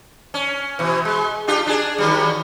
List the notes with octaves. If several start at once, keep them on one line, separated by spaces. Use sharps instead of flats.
C#4
B2 E3
G#3
D4 F4 G4
D4 G#4
D#3 F#3 G3